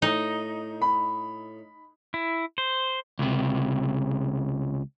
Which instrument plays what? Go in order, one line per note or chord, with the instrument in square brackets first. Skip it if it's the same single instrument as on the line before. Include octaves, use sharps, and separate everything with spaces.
[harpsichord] A2 [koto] D#4
[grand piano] B5
[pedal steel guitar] E4
C5
[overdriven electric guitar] C#2 C3